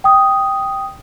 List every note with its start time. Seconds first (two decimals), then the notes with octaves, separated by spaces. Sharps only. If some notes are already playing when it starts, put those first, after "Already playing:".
0.04 G5 D#6